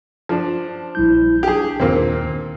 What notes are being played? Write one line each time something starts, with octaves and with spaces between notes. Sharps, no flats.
F3 D4
A#1 G3 E4 G6
D4 G4 G#4
D#2 A#2 D#3 A#3 C4